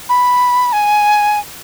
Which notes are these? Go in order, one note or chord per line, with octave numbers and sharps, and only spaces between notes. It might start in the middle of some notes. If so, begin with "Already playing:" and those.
B5
G#5